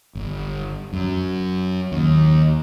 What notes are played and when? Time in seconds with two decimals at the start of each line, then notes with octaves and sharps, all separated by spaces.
0.15 G1
0.93 F#2
1.92 D#2